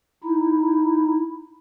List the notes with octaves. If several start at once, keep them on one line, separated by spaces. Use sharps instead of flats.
D#4 E4